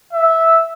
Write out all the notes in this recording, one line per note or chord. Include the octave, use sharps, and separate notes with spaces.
E5